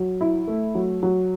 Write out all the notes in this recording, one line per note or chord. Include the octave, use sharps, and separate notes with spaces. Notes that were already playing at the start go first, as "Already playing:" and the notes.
Already playing: F#3
E4
A3
F#3
F#3